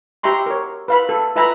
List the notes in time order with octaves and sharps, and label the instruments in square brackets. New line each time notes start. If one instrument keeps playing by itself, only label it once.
[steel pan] G4 E5 A#5 C6 C#6
A#4 C#5
B4 F5 B5
A4
F4 B4 E5 G#5 A#5 B5